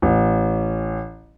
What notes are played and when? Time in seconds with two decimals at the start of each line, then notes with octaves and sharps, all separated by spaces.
0.02 A1